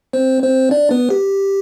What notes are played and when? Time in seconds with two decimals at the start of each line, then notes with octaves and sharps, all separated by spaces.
0.13 C4 C5
0.43 C4 C5
0.71 D4 D5
0.91 B3 B4
1.10 G4